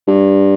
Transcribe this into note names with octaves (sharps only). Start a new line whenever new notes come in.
G2